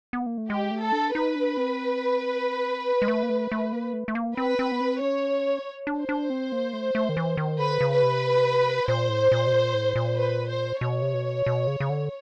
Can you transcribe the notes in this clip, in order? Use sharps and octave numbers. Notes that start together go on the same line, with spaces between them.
B3
A#3
A3
G#3 G4
A3
A4
D4
D#4 B4
D4
C4
G#3
A3
A#3
A3
A3
A#3
A3
A3
A#3
C4 B4
C4
B3
C4
C#4 C#5
D4
C5
D4
C4
A#3
A3
A3
D#3
E3
D#3
D3 B4
C#3
B4
C3
A#2 C5
A2
A#2
B2
A#2
A2
A#2
B4
C5
B2 C#5
C3
B2
B2
C#3
C#3
D3